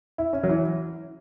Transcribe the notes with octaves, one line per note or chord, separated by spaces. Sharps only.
E4
C#4
F#3
E3